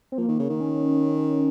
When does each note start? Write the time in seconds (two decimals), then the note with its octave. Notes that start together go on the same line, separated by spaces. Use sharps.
0.12 C4
0.18 F3 A#3
0.28 D#3
0.39 C#3
0.50 D#3
0.60 C#4